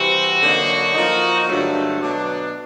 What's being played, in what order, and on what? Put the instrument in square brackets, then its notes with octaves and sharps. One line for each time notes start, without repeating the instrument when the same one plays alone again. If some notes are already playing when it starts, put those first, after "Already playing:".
Already playing: [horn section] C3 E3 G3 C4 [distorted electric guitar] F#4
[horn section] D3 F#3 A#3 D#4
F3 A#3 D#4
G2 D3 F#3 A3
B2 F#3 B3 D4